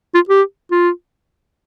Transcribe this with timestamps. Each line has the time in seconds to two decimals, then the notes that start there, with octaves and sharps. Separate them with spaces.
0.14 F4
0.29 G4
0.72 F4